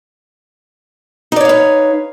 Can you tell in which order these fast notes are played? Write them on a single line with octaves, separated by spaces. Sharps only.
D#4 D5 C#5 F5 B4